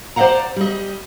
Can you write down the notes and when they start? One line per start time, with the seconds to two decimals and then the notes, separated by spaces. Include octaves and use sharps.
0.16 C5 D5 D#5 F5 F#5 A#5
0.56 G3 D#5